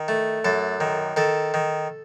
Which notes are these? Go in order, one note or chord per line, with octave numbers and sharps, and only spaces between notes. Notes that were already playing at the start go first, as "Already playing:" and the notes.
Already playing: D#3
A3
F#2 A4
D#3
D#3 A4
D#3